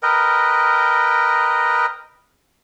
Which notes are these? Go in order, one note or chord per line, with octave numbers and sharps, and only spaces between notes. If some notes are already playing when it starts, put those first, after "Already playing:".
A#4 B4 D#5 G5